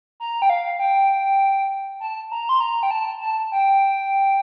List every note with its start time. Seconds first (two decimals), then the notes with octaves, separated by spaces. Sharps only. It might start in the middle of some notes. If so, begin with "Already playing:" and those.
0.20 A#5
0.42 G5
0.50 F5
0.80 G5
2.00 A5
2.32 A#5
2.49 C6
2.61 A#5
2.83 G5
2.91 A5
3.21 A5
3.52 G5